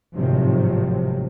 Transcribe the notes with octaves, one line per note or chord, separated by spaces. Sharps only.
G#1 A2 C3 D#3 F3 F#3